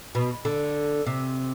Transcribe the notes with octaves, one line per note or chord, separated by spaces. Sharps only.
B2
D3
C3